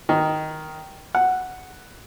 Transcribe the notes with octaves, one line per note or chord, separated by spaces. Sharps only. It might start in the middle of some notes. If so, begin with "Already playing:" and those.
D#3
F#5